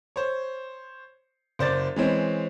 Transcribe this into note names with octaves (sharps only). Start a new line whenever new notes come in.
C5 C#5
F#1 C5 D5 A6
E3 G#3 C4 C#4